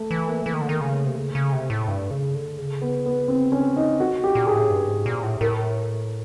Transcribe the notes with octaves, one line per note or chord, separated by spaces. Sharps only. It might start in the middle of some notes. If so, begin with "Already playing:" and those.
Already playing: A3
E3
A#3
E3 A3
D#3
D3
D#3 A#3
C#3
A3
C3
C#3
C#3
C3
A2
G2
C#3
D3
C#3
B3
B3
C4
C#4
D#4
C3 F#4
C#3
C3
G4
A#2
G#4
A2
G2
G#2
A#2
A2
A2 A#4